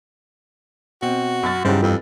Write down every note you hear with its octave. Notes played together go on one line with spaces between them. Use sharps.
B2 C4 F#4
F#2 F6 A6
G2 C#3 F#3 D#4 E4 G4 C5
F2 E3